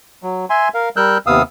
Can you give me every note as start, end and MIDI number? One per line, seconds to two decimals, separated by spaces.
0.23 0.45 54
0.50 0.69 76
0.50 0.69 80
0.50 0.69 84
0.74 0.89 70
0.74 0.89 77
0.96 1.18 55
0.96 1.18 70
0.96 1.18 88
0.96 1.18 90
0.96 1.18 91
1.27 1.42 39
1.27 1.42 48
1.27 1.42 59
1.27 1.42 77
1.27 1.42 87
1.27 1.42 88